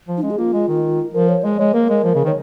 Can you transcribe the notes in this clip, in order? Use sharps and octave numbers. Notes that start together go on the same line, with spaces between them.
F3
D#4
G#3 C#4
G#4
A#3 F4
G#3
D#3
F3 A#4
C#5
G#3 D#5
G#3 C#5
A#3 A#4
G#3
F3
C#3
D#3
C#5